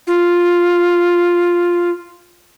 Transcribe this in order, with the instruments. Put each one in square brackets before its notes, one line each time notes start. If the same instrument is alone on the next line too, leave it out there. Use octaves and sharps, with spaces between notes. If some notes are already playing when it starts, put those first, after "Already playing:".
[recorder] F4